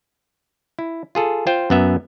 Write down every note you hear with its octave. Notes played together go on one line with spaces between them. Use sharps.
E4
F4 G#4 A4
F4 C5 G5
F#2 B3 E5